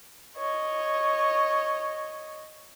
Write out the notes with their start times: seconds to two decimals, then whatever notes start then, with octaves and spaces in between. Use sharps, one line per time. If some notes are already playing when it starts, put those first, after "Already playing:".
0.37 C#5 D#5